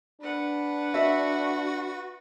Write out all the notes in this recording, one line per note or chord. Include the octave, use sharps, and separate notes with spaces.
D4 B4 F#5
F#4 E5